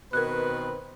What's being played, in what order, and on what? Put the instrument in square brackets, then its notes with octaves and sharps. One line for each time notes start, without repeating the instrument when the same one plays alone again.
[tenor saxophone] B2 [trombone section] D#3 C4 B4 [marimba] A#4 F#6